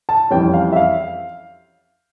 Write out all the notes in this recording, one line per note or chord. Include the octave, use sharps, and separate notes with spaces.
A5
F2 E3 G3 C#4 G5
F5
E5
F5